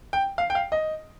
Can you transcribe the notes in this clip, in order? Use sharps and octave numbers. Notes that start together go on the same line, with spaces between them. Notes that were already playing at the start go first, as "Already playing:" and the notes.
G5
F5
G5
F5
D#5